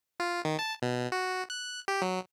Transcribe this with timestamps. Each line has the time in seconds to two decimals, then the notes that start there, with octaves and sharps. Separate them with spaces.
0.20 F4
0.45 D#3
0.59 A5
0.82 B2
1.12 F#4
1.50 F#6
1.88 G4
2.02 F#3